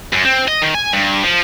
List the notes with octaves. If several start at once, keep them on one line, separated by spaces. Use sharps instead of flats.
F#2
C4
D#5
D#3
G#5
G2
F3